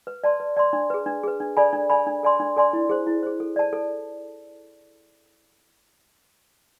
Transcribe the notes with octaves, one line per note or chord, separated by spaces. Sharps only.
B4
D5 A5 C6
B4
D5 A5 C6
D4
G#4 B4
D4
G#4 B4
D4
A4 D5 G#5 B5
D4
A4 D5 G#5 B5
D4
A4 D5 G#5 C6
D4
A4 D5 G#5 C6
E4
G#4 C5
E4
G#4 C5
A4
D5 A5
A4